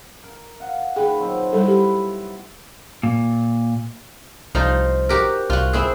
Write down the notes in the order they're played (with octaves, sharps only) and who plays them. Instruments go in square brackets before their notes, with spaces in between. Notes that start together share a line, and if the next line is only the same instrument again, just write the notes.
[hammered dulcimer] A#4
F5 F#5
[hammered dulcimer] A#2 D#3 B4 [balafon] G#4 G5
[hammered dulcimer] B2 F#3 C4
[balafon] G3 A4 [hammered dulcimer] E4 B4
[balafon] G4
[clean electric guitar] A#2
[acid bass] C2 [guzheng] F3 D#4 F4
[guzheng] F#4 G4 A#4
[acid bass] C2 [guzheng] F4 F#4
[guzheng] C4 E4 G#4